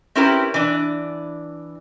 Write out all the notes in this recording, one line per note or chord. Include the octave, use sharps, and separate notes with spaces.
C4 C#4 E4 G4 A#4 B4
E3 D4